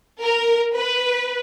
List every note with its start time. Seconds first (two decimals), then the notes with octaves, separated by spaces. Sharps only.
0.23 A#4
0.75 B4